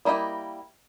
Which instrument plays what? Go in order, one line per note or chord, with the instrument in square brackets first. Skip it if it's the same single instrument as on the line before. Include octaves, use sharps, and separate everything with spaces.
[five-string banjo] G3 A#3 E4 D#5 G5